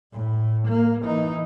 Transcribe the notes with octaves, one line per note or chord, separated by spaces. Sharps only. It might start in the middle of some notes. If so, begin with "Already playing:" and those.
A2
A#3
E3 D#4